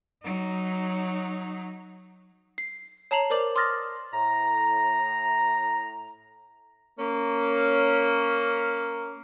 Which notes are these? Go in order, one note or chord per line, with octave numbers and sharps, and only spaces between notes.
F#3 D#4
C7
C#5 A5 A#5 C7 F7 F#7
A#4 C5 D5 D6 F#7
C6 D6 D#6 F6 A6 A#6
A2 A#5
A#3 C#4